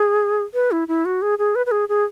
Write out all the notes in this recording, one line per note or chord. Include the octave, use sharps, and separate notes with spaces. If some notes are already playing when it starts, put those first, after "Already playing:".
Already playing: G#4
B4
E4
E4
F#4
G#4
G#4
B4
B4
G#4
G#4